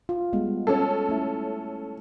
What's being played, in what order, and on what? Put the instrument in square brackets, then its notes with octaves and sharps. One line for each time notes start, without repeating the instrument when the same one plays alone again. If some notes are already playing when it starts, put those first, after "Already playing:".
[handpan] F4
G3 G#3 B3
[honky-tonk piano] C#4 A4
[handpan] A3 E4 E5